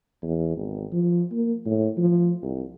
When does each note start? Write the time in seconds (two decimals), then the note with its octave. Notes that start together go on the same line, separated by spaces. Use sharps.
0.23 E2
0.56 G#1
0.93 F3
1.32 A#3
1.66 A2
1.98 F3
2.42 C2